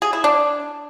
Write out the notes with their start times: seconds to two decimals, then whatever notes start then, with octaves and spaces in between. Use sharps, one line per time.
0.02 G#4
0.13 E4
0.24 D4